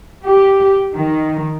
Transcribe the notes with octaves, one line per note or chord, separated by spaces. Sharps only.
G4
D#3